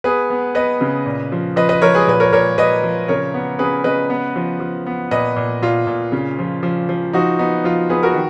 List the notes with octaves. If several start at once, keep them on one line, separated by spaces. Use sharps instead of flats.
B3 G#4 B4
B3
B3 B4 D#5
C#3
A#2
F3
F3 B4 D#5
B4 D#5
F3 A#4 C#5
G#4 B4
A#2 B4
A#4 C#5
A#2 A#4 C#5
A#2 B4 D#5
F3
C#3 A#4 C#5
B3
C#3 G#4 B4
C#3 B4 D#5
B3
F3
F3
B3
A#2 B4 D#5
A#2
A#2 F4
A#2
C#3
F3
F3
F3
F3 D#4 F#4
B3 D#4
F3 F4
B3 G#4 B4
F#4 A#4
D#3